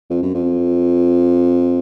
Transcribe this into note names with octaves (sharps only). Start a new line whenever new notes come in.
F2
F#2
F2